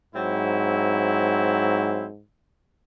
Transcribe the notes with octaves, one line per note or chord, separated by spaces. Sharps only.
G#2 F#3 C4 E4